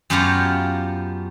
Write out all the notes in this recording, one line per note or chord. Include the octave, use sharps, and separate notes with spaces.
F#2 B3 F4 G4 C#5 A#5